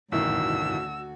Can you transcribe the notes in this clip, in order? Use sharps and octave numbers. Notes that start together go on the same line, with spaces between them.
A1 D2 G2 B2 D#3 E4 F#4 E6